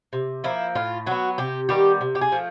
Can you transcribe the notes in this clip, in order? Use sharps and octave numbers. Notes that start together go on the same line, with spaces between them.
C3
F3 A#3 E4
A2 F4
F#3 B3 F#4
C3 G4
D#3 G3 B3 G4
C3
G4
G#4
F3 A3